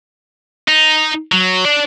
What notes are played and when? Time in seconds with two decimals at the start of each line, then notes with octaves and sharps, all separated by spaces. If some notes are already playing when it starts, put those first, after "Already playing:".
0.68 D#4
1.32 F#3
1.65 D4 D5